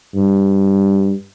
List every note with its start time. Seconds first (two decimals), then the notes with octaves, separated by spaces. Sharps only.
0.16 G2